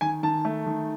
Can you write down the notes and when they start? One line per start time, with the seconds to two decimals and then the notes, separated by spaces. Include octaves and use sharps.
0.01 D#3 G#5
0.23 D#3 A5
0.45 A3
0.66 D#3